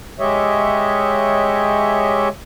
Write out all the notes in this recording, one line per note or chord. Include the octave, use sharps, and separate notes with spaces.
G#3 G4 C#5 D#5 E5